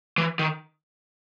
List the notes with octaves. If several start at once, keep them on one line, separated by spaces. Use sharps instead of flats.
E3
D#3